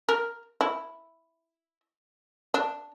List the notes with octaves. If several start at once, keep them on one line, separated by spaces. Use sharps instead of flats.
A#4
E4
D4